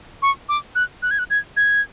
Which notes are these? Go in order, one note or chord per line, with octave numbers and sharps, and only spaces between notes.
C#6
D6
F#6
F#6
G#6
F#6
G#6
G#6